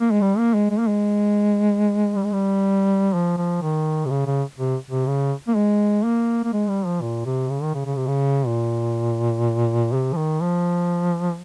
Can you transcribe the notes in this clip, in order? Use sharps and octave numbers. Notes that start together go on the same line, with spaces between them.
A#3
G#3
G3
A#3
G#3
G#3
A#3
G#3
G3
G#3
G3
F3
F3
D#3
C3
C#3
C#3
C3
C3
C#3
A#3
G#3
A#3
A#3
G#3
G3
F3
A#2
C3
C#3
D#3
C#3
C#3
C3
C#3
A#2
C3
F3
D#3
F3